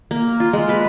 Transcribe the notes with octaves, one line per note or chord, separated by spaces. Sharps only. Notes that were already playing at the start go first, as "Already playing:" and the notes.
A#3
F4
G#3
B4